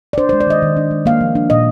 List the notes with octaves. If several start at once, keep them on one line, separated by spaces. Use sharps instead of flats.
D5
D4 C5
G#3 C5
D5
D#3 D#5
D#3
D4
G#3
A#3 F5
F3
D4
A#2 D#5